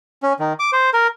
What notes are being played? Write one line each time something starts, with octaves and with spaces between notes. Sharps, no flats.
C#4
D#3
D6
C5
A#4